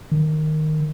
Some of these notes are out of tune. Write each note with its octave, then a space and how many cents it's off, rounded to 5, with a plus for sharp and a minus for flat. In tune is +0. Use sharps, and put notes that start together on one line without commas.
D#3 -10